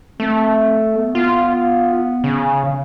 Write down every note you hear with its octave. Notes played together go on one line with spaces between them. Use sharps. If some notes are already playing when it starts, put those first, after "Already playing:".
A3 C4
B3
B3 F4
C#3